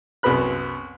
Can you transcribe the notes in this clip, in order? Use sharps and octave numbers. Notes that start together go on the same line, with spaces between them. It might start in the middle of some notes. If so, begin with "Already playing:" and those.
C2 F#2 B3 B5 F#6